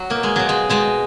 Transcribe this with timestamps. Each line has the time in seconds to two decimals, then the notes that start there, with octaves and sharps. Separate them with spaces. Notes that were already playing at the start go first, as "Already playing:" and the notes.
Already playing: F#3
0.10 B2 A#3
0.23 G#3
0.36 B2 F#3
0.49 G#3
0.70 B2 G#3